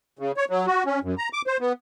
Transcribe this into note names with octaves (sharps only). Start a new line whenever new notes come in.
C#3
C#5
F#3
F#4
C#4
F#2
A#5
D6
C5
B3